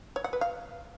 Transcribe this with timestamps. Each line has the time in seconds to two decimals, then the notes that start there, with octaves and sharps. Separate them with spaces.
0.16 C#5
0.24 F#5
0.33 B4
0.41 F5